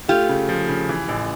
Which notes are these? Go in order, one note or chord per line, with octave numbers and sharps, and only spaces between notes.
A3 F4 G4
C#3
F3
C#3
E3
A1